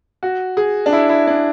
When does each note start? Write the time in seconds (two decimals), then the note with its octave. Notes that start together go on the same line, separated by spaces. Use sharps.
0.23 F#4
0.57 G#4
0.86 D4
0.93 E4
1.09 E4
1.27 D4